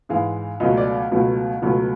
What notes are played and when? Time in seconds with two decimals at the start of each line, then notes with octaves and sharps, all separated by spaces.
0.09 G#2 E3 G#3 F5
0.60 C#2 B2 F#3 A3 D#5
0.77 D5
1.11 C#2 B2 F#3 A3
1.62 C#2 B2 F#3 A3